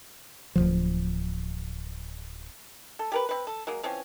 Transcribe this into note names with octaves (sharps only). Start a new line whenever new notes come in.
D1 B1 F3
A4
G4 A#4 B4
C4 B4
A4
F#3 G#3 A#3
E3 F3 C4 C#4